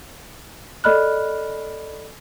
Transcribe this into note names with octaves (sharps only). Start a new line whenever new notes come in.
A4 D5 D#5 B5 F6 F#6